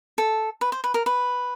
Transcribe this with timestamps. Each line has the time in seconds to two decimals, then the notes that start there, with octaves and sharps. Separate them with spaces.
0.18 A4
0.61 B4
0.72 C5
0.84 B4
0.94 A#4
1.06 B4